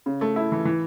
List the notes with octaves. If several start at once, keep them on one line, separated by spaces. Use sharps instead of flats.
C#3
A3
E4
E3
E3